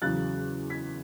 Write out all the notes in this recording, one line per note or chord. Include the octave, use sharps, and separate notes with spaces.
E2 C#3 F#3 F#6 A6
G#6 B6